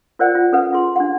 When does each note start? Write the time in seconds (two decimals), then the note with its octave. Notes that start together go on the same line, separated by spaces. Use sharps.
0.19 F4 A#4 C5 D5 F#5 G5
0.35 F4
0.52 C#4 A4 B4 F#5
0.73 F4 G#4 C6
0.96 D4 G4 F#5